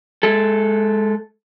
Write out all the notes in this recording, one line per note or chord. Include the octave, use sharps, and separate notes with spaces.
G#3 A4